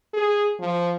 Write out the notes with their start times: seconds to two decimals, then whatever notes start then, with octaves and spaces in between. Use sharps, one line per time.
0.13 G#4
0.59 F3